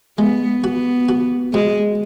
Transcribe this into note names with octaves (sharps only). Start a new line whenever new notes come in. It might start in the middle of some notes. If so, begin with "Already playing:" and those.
G#3 B3
B3 F#4
F#4
B2 G#3